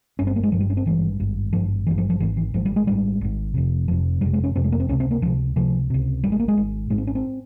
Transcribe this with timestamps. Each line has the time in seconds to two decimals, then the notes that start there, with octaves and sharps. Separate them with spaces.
0.19 G1 G2 C#4
0.27 C4
0.36 A#3
0.43 G#3
0.52 G1 G2 F3
0.60 G3
0.70 C#4
0.77 C4
0.86 G#1 G2 E3
1.20 G#1 G2
1.53 G#1 G2 F3
1.87 G#1 G2 E3
1.98 F3
2.10 F3
2.20 G#1 E3
2.23 G#2
2.37 E3
2.54 G#1 G#2 F3
2.65 G3
2.76 G#3
2.87 G#1 G#2 G3
3.21 G#1 G#2
3.54 F1 F2 C3
3.88 F1 F2 C3 F3
4.21 F1 F2 C3 G3
4.33 G#3
4.44 C#4
4.55 F1 F2 C3 C4
4.64 G#3
4.72 A#3
4.80 C4
4.89 C#2 C#4
4.92 C3
5.00 C4
5.11 A#3
5.22 C#2 C3 F3
5.56 C#2 C3 F3
5.90 C#2 C3
6.23 G#1 G#2 G3
6.32 G#3
6.40 A#3
6.48 G#3
6.57 G#1 G#2
6.90 G#1 G#2 G#3
6.98 C4
7.07 C#4
7.15 C4